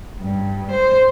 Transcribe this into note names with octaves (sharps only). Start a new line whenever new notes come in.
G2
C5